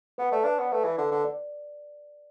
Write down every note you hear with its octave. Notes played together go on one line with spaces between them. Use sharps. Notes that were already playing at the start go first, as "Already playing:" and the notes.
B3 B4
A3 D5
D4 B4
B3
A3 B4
E3
D3
D3
D5